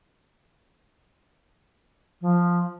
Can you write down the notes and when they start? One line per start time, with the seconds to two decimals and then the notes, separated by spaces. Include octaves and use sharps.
2.21 F3